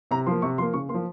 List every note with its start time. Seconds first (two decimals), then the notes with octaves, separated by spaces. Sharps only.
0.11 C3 A#5
0.26 F3 A#3 C6
0.42 C3 C#6
0.58 F3 A#3 C6
0.74 C#3 C#6
0.89 A#3 C6
0.94 F3